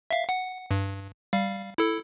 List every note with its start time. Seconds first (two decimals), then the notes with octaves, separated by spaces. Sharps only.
0.11 E5 F5
0.29 F#5
0.71 G2
1.33 G3 F5
1.78 E4 A4